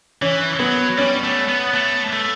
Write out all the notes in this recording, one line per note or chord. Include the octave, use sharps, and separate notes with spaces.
E3 C#4
F#3 B3
G3 C#4
A3
B3
A3
A3